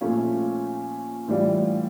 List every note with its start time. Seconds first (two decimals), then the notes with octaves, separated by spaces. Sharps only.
0.01 A#2 F3 A3 C#4 F4
1.28 A2 E3 G3 D4 F4